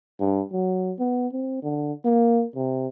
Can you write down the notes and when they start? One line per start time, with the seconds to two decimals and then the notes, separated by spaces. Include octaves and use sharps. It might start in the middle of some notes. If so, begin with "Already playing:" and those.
0.20 G2
0.52 F#3
0.99 B3
1.33 C4
1.63 D3
2.05 A#3
2.55 C3